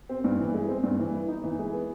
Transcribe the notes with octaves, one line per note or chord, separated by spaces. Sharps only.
C4
G2
E3
G#3
C4
G2
E3
B3
D#4
E3
G#3
B3